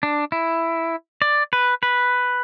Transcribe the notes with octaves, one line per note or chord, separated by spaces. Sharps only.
D4
E4
D5
B4
B4